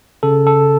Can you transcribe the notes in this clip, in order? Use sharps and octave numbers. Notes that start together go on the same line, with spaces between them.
C#3 A4
A4